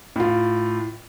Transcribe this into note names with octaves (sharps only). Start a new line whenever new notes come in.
A2 F4